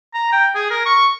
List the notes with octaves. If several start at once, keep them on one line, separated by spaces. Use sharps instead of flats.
A#5
G5
G#4
A#4
C#6